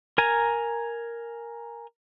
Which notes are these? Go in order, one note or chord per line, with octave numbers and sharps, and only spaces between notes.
A#4 G#5 A#5